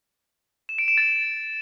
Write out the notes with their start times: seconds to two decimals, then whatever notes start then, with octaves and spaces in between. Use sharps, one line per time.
0.69 E7
0.78 D7
0.88 E7
0.98 A6